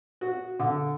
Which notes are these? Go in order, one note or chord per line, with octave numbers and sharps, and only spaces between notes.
F#4
D3